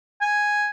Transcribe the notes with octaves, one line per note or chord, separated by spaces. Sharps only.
G#5